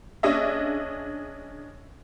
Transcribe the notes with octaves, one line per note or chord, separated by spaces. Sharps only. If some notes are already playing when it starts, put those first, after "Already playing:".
C#4 D4 G#4 D#5 E5